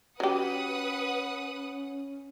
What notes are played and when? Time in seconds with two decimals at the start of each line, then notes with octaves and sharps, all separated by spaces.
0.20 F#3 C#4 G4 B4 F#5 D#6